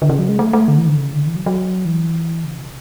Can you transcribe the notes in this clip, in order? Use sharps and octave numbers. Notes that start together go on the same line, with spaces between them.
D3
C#3
F#3
G#3
A3
A3
D3
E3
D3
C#3
D3
E3
F#3
F#3
E3
C#3
B2